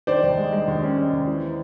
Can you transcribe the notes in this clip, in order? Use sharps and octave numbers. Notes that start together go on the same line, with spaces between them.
D#3 C5 D5
D#2
G#3
G#3
D#2
C#4
G#3
D#2
E3